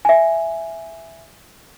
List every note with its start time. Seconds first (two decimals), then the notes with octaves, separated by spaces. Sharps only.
0.05 E5 G#5